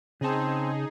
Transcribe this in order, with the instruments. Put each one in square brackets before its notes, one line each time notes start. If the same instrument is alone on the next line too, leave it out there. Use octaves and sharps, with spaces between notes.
[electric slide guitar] C#3 A5 [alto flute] C4 [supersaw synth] D#4 G#4